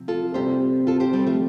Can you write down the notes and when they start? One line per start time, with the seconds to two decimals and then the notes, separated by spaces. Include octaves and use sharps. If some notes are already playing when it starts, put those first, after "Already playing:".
Already playing: C3 F3 C4
0.08 F4 A4
0.34 C3 G3 C4 G4 C5
0.87 F4 A4
1.00 G4 C5
1.13 G3 C4
1.27 F3 A3